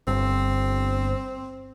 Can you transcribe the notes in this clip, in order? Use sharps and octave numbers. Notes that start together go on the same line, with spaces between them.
G1 C4